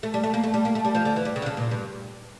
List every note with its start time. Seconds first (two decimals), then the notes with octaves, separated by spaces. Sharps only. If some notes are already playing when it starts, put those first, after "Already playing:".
0.03 A3
0.14 G3
0.24 A3
0.34 A#3
0.43 A3
0.54 G3
0.65 A#3
0.75 A3
0.85 G3
0.95 F3
1.05 D3
1.16 E3
1.25 G3
1.36 C#3
1.42 D3
1.46 C#3
1.57 A#2
1.71 G2